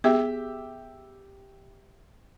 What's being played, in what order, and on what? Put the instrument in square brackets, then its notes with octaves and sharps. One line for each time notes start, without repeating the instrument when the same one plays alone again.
[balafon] B3 [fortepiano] G4 E5 [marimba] G#4